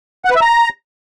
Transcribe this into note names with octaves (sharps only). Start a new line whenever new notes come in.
F#5
B4
E5
A#5